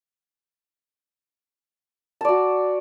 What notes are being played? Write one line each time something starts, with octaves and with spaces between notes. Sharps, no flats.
F#4 D5 A5